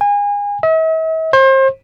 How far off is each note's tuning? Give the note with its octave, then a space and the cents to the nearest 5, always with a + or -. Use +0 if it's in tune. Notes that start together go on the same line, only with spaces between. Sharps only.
G#5 -30
E5 -45
C5 +35